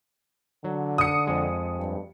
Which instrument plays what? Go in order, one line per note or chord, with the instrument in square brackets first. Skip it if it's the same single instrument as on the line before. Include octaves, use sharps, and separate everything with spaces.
[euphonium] D3 [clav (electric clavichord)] F#3
[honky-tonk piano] D#6 C#7
[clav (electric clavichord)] F2 G#3
[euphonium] G2